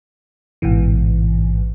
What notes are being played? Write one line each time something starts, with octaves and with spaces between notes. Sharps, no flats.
A1 G#2 B2 E3